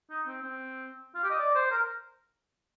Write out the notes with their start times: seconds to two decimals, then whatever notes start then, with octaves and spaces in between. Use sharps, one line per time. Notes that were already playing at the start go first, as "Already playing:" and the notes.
0.10 D#4
0.27 C4
0.42 C4
1.15 F4
1.23 G4
1.30 D#5
1.39 D5
1.55 C5
1.71 A#4